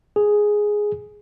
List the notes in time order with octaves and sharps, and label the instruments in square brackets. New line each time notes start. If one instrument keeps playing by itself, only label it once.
[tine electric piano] G#4